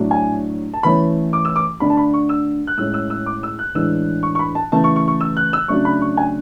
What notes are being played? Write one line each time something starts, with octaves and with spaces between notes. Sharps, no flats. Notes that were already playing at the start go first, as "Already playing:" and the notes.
Already playing: A2 F#3 A3 D4
G#5
A5
E3 A3 C#4 B5
D6
E6
D6
D3 A3 D4 B5
A5
B5
C#6
E6
F#6
A2 G#3 C#4 E6
E6
E6
D6
E6
F#6
A2 E3 G#3 D4 E6
C#6
C#6
B5
A5
C#3 E3 A3 A5
C#6
C#6
C#6
E6
F#6
E6
C#3 F#3 A3 D4 C#6
B5
C#6
G#5